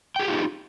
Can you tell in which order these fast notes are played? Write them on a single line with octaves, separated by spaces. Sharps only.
G5 G#4 G4 F4 D#4